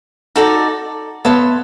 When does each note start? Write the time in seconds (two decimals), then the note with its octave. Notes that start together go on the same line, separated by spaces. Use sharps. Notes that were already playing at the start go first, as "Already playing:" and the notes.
0.36 D#4 F#4 A4 D5
1.25 B3 C#5 E5 A5 C6